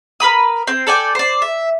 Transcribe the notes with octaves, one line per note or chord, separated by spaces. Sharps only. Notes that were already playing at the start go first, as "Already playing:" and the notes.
A#4 B4 B5 D#6
C4 C6
A4 D5 G5 G#5
C5 D5
E5